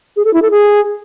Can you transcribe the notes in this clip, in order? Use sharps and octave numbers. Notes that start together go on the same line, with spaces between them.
G#4
A4
E4
A4
G#4